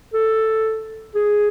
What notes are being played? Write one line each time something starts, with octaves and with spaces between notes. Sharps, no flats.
A4
G#4